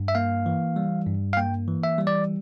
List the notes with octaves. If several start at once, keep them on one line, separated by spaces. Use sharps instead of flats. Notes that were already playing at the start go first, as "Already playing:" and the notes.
Already playing: G2
E5
A#3 F5
E3
G3
G2
F5
A#3 G5
E3
E5
G3
D5